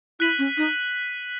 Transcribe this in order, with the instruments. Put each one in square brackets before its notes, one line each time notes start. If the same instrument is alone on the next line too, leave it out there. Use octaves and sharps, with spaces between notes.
[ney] E4 [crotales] F#6 B6 D#7 F#7
[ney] C#4
D#4